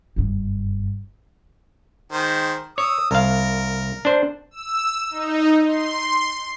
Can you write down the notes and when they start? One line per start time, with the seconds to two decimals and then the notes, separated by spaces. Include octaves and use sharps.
0.16 F#1 G2
2.12 D#3 G#3 C5
2.78 C#5 D#6 E6
3.11 C2 A#4 F5
4.05 D4 C5
4.51 E6
5.10 D#4
5.65 C6